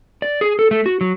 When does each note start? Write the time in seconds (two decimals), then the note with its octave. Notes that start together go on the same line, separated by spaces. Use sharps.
0.22 D5
0.41 G#4
0.59 A4
0.71 A3
0.86 F#4
1.01 F#3